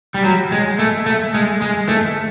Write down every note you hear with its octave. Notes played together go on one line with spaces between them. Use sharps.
G3
F#3
G#3
A3
A3
G#3
G#3
A3